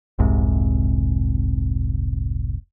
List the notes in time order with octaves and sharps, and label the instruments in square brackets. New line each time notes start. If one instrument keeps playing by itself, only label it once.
[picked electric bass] F1 C2 G#2 C3